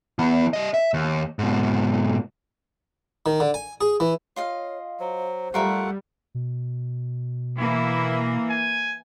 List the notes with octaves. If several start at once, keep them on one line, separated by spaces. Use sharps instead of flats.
E3 B3
G3 D#5
E5
D#2
G#2 B2
D#3
D3
G#5
G#4
E3
F4 C#5 D#5 F5
F#3 C5
G3 A3 F4 A#4 E5 F#5
B2
E3 A#3 E4
G#5